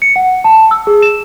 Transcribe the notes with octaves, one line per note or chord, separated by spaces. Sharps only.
C#7
F#5
A5
E6
G#4
E7